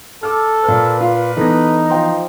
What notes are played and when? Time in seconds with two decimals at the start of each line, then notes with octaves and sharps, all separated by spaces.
0.23 A4 D6 E6 F6
0.64 A#2 B4 F6
1.01 F4
1.37 E3 B3 D#4 A4 A#6
1.90 F3 G5 C6